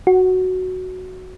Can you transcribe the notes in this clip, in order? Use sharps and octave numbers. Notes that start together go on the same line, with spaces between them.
F#4